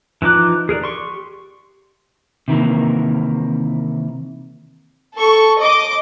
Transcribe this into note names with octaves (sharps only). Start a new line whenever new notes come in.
E3 F3 D#4 D6 F#6
G#4 A#4 B4 D5
G4 C6 C#6
C3 D#3 E3 A#3
A4 C#6
D#5 D6